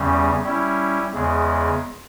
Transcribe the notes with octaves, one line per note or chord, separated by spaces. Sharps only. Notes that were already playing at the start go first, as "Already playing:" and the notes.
Already playing: E2 C#3 G3 C#4
G3 C#4 E4
E2 C#3 G#3